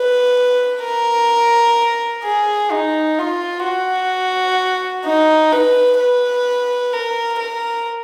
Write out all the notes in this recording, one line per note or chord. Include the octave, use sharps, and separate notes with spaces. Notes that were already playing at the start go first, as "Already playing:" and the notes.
Already playing: B4
A#4
G#4
D#4
F4
F#4
D#4
B4
B4
A#4
A#4